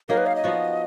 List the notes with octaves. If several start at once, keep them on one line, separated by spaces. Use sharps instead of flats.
F#3 A#3 D#4 G#4 A#4
B4
F5
D#5
F3 B3 F#4